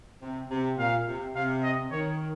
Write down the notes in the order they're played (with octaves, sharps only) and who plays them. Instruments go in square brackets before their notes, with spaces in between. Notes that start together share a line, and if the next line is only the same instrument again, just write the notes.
[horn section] C3
C3
[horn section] A#2 [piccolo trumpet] F5
[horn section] C3
[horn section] C3 [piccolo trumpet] F5
[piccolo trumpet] D#5
[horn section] D#3 [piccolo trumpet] C#5